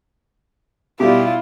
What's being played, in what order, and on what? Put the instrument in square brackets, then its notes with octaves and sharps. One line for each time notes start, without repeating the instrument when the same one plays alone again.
[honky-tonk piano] B2 G3 [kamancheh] E4 F4 [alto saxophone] G4